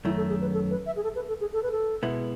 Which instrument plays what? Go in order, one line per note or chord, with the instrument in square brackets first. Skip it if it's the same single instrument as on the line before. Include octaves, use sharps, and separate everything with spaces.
[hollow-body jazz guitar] F#2 D#3 A3 [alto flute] E4
[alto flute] A4
G#4
B4
A4
B4
E5
G#4
A4
B4
A4
G#4
A4
B4
A4
[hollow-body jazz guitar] B2 G#3 B3 E4